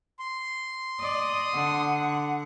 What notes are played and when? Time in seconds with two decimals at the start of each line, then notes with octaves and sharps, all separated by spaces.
0.19 C6
1.00 D5 D#5 D#6
1.52 D3 F#5